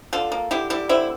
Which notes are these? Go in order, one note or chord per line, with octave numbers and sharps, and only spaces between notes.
D3 F4 A4
A#3
D3 E4 G4
G3 E4 G4
D3 C4 E4